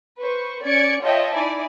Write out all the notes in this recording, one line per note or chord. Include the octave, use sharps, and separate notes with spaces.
B4 C5 C#6
C#4 D5 G#6 C#7 D7
F4 C#5 D#5 E5 G5 A5
D#4 E4 D5 G#5